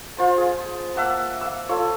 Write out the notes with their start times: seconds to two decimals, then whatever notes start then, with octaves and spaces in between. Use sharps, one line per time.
0.17 F4 C5 A5
0.38 G#4
0.96 A#3 E5 F#5 A5
1.41 F5 E6
1.69 F4 A4 C#5